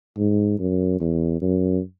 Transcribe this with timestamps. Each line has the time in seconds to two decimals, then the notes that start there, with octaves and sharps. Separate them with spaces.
0.18 G#2
0.59 F#2
1.01 E2
1.42 F#2